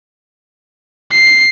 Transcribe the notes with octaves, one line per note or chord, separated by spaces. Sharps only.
C7